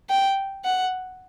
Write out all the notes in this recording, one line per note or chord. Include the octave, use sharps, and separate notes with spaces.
G5
F#5